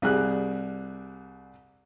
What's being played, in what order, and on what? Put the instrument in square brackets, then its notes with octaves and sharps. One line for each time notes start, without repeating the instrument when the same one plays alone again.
[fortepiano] C2 G3 G#4 F#6